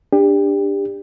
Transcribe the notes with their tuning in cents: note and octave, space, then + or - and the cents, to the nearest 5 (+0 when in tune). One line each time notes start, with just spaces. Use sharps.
D4 +0 G4 +25